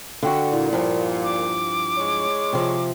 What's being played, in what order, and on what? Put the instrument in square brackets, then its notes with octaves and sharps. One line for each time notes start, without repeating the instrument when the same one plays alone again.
[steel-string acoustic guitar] D3 F#4 [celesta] F5 G5 C#6
[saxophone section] A#2 [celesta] E4
[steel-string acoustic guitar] G2 F3
[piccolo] D6
[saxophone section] G#3 C#5
[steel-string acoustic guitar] C3 F3